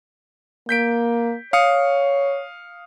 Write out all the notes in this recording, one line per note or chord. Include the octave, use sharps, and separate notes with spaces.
A#3 G6 B6 D7
C#5 F5 D#6 C#7